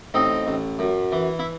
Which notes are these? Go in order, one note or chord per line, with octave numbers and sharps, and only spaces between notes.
A1 C4 D#4
A1
F#2
E3
E4